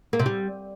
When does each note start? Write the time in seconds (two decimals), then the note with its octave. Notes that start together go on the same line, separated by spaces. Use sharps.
0.13 A#3
0.19 C3
0.26 G3